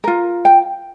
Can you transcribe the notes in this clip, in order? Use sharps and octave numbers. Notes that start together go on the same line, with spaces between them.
F4 A#4
G5